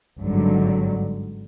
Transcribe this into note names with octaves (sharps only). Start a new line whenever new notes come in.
G#1 G2 D3 F#3